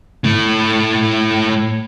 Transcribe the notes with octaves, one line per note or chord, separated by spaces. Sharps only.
A2 A3